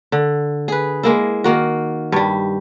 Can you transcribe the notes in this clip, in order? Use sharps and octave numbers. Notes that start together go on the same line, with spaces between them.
D3
G#4 B4
G#3 A#3 E4
D#3 A#3 F#4
G2 G3